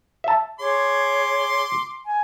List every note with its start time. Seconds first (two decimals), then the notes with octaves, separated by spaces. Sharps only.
0.24 E5 A5
0.60 G#4 C#5 C6 D6
2.05 G#5